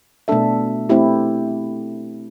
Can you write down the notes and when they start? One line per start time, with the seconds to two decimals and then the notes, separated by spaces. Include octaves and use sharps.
0.28 B2 A3 D4 A4 E5
0.89 A3 C4 E4 G4